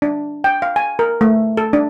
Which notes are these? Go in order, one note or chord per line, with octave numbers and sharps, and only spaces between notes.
D4
G5
F5
G#5
A#4
A3
A4
D4